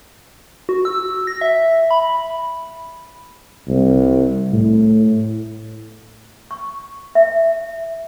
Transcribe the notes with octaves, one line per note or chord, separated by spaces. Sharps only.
F#4
E6
A#6
E5
B5
C2
A2
C#6
E5